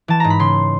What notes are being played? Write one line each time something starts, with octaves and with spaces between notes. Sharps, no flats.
E3 A5
G#2 A#5
B5
C#3 C6